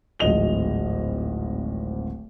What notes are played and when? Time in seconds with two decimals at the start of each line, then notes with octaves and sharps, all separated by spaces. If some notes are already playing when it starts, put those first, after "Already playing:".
0.19 D1 G#1 F3 D#5 F7 G7